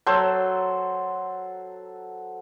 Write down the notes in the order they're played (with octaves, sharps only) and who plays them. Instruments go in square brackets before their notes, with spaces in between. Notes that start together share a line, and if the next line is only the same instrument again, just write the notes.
[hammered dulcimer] F#3 A4 C5